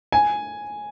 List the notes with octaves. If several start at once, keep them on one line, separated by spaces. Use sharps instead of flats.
G#5